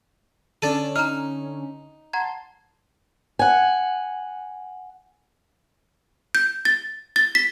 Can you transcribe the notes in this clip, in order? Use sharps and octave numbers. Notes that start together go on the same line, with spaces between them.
D3 C#4 D4 A4 A6 D#7
D#4 A#5 F6
F#5 A5 A#5 C6 G#6
F#5 G#5
G6
A6
A6
B6